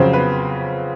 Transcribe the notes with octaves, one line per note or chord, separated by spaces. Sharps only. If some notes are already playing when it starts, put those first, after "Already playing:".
Already playing: F2 C#3 F#3 C4 C5
B3 B4